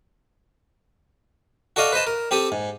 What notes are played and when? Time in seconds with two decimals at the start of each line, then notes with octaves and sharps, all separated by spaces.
1.76 F#4 A4 D5 D#5 F5
1.92 B4 C5 D#5 A5
2.07 A#4
2.31 C4 G4 A4 D#6
2.52 G#2